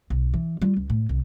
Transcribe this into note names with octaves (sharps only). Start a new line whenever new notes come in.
B1
E3
G3 F4
C#2
A2
C2